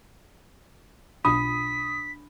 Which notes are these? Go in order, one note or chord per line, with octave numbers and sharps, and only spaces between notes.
B1 B2 D4 F4 B5 D#6 B6